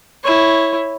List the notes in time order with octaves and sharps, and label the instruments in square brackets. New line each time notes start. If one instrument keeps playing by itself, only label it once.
[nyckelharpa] E4 C#5